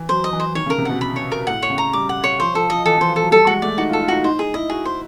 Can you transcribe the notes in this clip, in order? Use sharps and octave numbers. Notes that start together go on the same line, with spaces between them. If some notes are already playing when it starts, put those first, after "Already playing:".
Already playing: E3
F#3 C5
D#5
E3
C5
D#3 C#5
C#3
A#4
C3
B2 F#5
B5
C#5
A#4
A2 F#5
C#5
C#3
A#5
G3 D6
F#5
C#5
F3 C5
F3 A4
F3 D#5
E3 A4
E3
C5
F3
F#3 A4
G3 A4
G#3 F#4
A3 D5
D#4 F#4
F4
A4
F4
D#4 F#4
D#4 C5
D#4 G#4
E4 D#5
F#4 G#4
C5